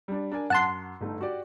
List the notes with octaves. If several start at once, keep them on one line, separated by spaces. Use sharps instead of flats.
G3 D4
D4 A#4 G#5
F#2 F#5 A5 C6
G1 A3 D#4
F#4 G4 D5